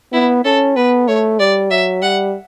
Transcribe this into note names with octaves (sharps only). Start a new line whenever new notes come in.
B3 E4
C#4 A4
B3 B4
A3 C#5
G3 D5
F#3 E5
G3 F#5